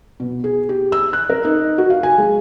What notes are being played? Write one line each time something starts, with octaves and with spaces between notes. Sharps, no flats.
B2
G#4
G4
E6
F#6
A#4
D#4
F#4
F5
G#5
G#3